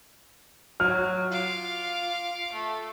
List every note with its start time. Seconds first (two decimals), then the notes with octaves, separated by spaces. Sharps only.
0.80 F#3 F6
1.31 F4 F5 D6
2.53 A3